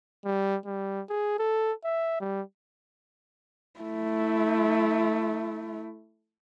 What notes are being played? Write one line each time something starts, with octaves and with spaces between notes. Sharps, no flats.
G3
G3
G#4
A4
E5
G3
A3 E4